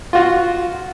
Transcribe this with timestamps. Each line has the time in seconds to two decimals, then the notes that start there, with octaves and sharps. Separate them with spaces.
0.13 F4 F#4